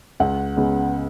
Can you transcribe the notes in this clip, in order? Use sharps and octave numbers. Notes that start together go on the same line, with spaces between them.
C#2 F#5
C#3 G#3 B3